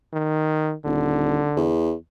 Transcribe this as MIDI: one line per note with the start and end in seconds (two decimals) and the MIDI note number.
0.13 0.74 51
0.85 1.47 27
0.85 1.73 50
1.57 1.93 40